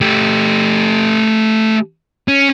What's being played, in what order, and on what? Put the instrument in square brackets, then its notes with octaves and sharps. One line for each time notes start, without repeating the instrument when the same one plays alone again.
[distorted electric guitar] A3 G4
C#4